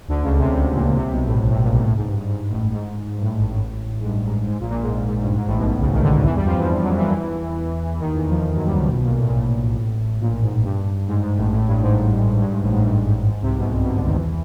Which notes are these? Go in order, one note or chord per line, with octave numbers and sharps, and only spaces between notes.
D2 D3
C#2 C#3
C2 C3
C2 C3
A#1 A#2
C2 C3
B1 B2
A1 A2
A1 A2
A#1 A#2
A1 A2
A1 A2
G#2
G2
G2
G#2
A1 A2
G#2
G2
A2
G#2
A1 A2
A1 A2
G#2
G2
G#2
G#2
A#1 A#2
A#1 A#2
G#2
A#1 A#2
G#2
G2
G#2
A1 A2
B1 B2
C#2 C#3
D#3
D2 D3
E2 E3
G2 G3
F2 F3
E2 E3
F#2 F#3
E2 E3
D#2 D#3
E2 E3
F2 F3
F#2 F#3
G2 G3
C#2 C#3
B1 B2
A#1 A#2
A2
A#2
A1 A2
A#1 A#2
G#2
G2
G#2
G#2
A1 A2
A1 A2
G2
G#2
G2
G#2
A1 A2
G#2
G2
G#2
G#2
C2 C3
B1 B2
G2
B1 B2
D2 D3
D#2 D#3
E2 E3